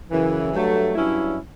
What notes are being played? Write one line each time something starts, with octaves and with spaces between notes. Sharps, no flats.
F#2 C#3 E3
G2 F#3 A3
G2 F#3 C#4 E4